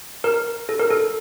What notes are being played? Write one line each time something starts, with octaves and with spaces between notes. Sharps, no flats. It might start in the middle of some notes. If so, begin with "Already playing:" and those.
A#4
A4
A#4
A4